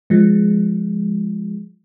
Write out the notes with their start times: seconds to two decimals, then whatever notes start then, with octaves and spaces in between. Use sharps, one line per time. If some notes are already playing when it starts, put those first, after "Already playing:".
0.10 F3 G#3